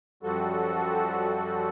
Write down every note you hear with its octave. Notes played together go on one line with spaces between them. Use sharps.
F#2 F3 G3 F#4 A4